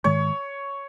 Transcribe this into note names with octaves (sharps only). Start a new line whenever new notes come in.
G#2 D#3 G#3 C#5